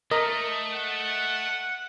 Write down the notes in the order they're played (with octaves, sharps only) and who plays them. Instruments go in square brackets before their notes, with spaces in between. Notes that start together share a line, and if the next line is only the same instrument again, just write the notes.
[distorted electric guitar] A3 [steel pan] A#4 [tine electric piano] D#5
[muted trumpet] F#5